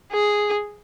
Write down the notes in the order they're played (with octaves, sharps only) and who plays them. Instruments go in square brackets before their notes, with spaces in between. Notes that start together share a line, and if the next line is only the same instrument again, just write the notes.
[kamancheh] G#4